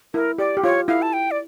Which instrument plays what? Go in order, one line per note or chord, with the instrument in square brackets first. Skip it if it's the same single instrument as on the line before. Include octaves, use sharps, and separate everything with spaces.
[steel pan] E4 [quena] A#4
[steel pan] G4 [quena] D5
[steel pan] G4
[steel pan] F4 [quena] C#5
[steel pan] E4 [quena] F5
[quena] A5
G5
D5